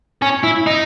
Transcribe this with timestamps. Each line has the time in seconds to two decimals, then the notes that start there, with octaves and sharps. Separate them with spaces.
0.22 C#4
0.43 E4
0.67 D#4